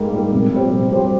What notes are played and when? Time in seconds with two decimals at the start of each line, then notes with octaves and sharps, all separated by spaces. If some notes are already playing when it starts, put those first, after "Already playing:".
Already playing: G#2 G3 A#3
0.12 G3 A#3
0.32 C3
0.51 G3 C4 G4 C5
0.72 C3
0.91 G3 C4 G4 C5